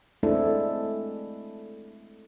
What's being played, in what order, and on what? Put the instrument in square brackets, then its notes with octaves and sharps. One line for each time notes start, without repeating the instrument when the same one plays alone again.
[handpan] G#3 A3 C4 D4 E4 A4